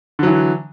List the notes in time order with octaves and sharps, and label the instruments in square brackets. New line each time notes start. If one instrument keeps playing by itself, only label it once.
[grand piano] D3
F#3
E3